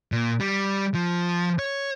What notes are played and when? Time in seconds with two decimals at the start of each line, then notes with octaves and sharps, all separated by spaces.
0.12 A#2
0.40 G3
0.94 F3
1.59 C#5